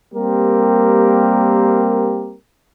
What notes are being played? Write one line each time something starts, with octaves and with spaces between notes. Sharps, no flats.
G3 A#3 C4 G4 A#4